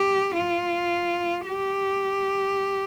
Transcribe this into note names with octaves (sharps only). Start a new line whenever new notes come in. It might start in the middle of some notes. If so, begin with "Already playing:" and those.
Already playing: G4
F4
G4